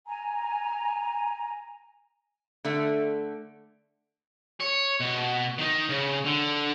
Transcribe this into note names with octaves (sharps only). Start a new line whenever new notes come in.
G#5 A#5
D3 A3
C#5
B2
D#3 D#4
C#3
D3